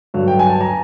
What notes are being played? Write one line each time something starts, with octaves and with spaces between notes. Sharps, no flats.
G2 D3 F#3
G5
G#5
A5
A#5